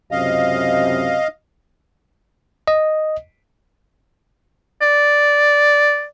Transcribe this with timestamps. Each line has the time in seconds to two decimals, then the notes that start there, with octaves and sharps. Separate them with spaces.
0.11 C#2 F#2 C3 D#5 F5
2.68 D#5
4.82 D5